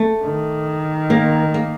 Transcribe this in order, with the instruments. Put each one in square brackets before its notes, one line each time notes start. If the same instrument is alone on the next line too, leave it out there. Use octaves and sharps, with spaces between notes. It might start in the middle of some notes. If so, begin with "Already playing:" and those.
Already playing: [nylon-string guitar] A3
[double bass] D#3
[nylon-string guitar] A#3
A#3